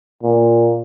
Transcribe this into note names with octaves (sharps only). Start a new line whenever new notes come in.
A#2